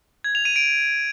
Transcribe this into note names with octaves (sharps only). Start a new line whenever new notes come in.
G#6
F7
D#7
D7